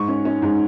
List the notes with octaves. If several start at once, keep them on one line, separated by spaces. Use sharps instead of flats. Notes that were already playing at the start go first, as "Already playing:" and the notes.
Already playing: G#2 C#6
C#4
C#4
G#2